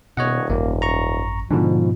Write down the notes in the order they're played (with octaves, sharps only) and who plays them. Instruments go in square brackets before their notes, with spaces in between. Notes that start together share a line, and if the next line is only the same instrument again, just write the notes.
[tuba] D#1 [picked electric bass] B2 [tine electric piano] C#5 D#5 F#5
[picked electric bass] G#1 F#2 [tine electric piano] A#3
[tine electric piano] A#5 C#6
[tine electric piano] G#2 B2 [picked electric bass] D3 D4 [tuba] F3